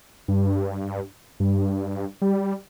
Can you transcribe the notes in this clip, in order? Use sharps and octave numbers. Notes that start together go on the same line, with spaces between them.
G2
G2
G3